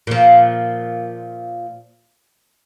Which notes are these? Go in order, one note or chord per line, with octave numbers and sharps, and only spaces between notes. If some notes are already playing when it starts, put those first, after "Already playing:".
A#2 F3